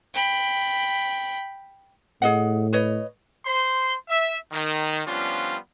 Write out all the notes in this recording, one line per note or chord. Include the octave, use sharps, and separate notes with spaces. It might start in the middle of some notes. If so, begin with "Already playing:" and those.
G5 B5
A2 G#4 D#5 F#5
B4 C#5 D#5
C5 C6
E5
D#3
F3 G3 B3 C#4 D4 F4